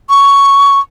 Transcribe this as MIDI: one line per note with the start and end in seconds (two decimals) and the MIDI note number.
0.10 0.80 85